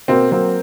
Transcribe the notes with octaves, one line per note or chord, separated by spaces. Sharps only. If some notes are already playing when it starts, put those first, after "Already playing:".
B2 A#3 C4
F#3 A#3 C4